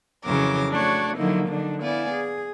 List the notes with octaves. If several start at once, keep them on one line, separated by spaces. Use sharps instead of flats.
F2 C#3 E3 F#3 A#4 D6
A3 D4 F#4 C#5
D3 F3 F#3 A#3 D#4 E4
D3 F#3 D4 D#4
B3 E4 D5 F5 G#5
G#4